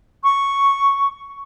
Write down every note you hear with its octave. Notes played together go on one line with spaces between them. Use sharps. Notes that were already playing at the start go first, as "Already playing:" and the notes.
C#6